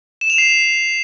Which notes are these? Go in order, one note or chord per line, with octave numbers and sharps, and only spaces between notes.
E7
F7
C7